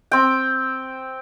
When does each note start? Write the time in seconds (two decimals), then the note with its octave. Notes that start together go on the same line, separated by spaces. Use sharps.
0.12 C4 G5